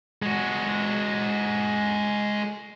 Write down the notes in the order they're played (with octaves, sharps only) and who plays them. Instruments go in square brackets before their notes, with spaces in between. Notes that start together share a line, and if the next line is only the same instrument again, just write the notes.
[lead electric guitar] G#3 F#4